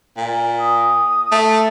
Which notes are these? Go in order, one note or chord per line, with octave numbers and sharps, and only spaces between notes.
A#2
D#6
A3